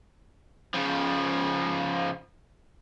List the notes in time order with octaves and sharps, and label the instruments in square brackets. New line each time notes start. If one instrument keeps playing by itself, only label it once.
[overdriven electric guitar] C#3 F3